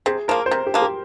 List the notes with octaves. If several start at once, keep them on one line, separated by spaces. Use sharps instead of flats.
C3 G#4
F3 A#3 A#4
C5
C3 A#4
G4
F3 A#3
G4